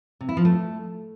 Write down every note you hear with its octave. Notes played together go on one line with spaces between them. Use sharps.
C3
E4
F3
A3